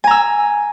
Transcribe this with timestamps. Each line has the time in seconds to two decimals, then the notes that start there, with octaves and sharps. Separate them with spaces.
0.04 G#5
0.07 A#5
0.11 E6